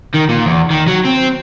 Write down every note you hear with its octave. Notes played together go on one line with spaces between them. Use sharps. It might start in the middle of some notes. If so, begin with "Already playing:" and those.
D#3
A#2
E2
D#3
F#3
C4